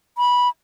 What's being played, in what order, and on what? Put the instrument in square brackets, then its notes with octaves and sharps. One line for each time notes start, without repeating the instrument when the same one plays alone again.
[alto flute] B5